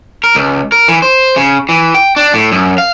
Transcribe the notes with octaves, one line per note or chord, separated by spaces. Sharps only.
A#4
C#2
A#4
E3
C5
C#3
E3
G5
D4
A2
F#2
F5